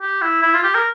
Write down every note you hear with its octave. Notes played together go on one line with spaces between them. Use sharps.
G4
E4
E4
F4
G4
A#4